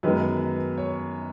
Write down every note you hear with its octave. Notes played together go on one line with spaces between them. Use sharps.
F#2 D#3 G#3 B3 B4
C#5